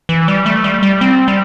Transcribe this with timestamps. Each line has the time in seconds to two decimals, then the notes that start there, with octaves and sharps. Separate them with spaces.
0.09 E3
0.28 G3
0.46 A3
0.64 G3
0.83 G3
1.01 C4
1.28 G3